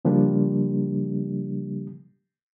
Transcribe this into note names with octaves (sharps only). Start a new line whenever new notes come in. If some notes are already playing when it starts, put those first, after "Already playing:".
C#3 F3 G3 A#3 D4 G4